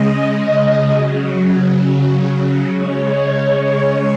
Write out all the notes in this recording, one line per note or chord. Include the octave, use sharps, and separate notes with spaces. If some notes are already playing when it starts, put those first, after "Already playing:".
Already playing: C#3 G#3 D#5
C#3 F#3
C#3 G#3 C#5